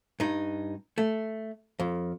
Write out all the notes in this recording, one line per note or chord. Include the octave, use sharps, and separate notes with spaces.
G2 D#4
A3
F2